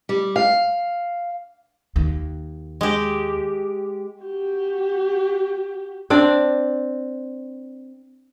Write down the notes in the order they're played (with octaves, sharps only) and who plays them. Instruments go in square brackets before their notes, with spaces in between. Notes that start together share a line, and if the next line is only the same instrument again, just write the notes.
[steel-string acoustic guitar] G3
F5
[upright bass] D#2
[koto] G#3 G4
[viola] F#4 G4
[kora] C4 D4 D5